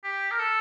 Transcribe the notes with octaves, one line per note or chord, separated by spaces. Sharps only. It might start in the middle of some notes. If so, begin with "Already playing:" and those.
G4
A#4
A4